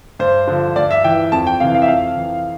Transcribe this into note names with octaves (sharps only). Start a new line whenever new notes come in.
G2 C5
D3 F3
G2 D5
E5
E3 G5
F2 A5
G5
C3 E3 F5
F5
E5
F2 F5
E3